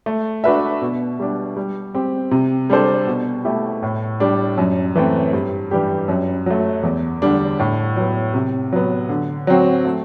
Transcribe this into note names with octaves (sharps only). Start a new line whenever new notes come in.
A3
D4 F#4 B4 E5
B2
G3 D4
G3
C4 G4
C3
G3 D4 A4 C5
B2
A3 E4 G4
A2
G3 D4
F#2
E3 A3 C4
G2
E3 G3 D4 G4
F#2
F#3 A3
E2
D3 G3 D4
A2
F#3 B3
C3
F#3 B3
D3
F#3 C4 F#4
A3